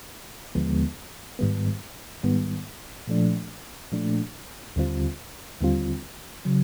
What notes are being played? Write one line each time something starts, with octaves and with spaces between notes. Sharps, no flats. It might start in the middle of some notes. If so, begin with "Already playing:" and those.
D#2 D3 F3 G#3 B3
G#2 D#3 G3 B3
G#2 D#3 G3 B3
A#2 F3 A3 D4
A#2 F3 A3 D4
D#2 D3 G3 C4 F4
D#2 D3 G3 C4 F4
C#3 F#3